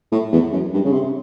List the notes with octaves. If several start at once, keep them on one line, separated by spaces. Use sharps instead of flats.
A2
E2
F#2
G2
C#3
C3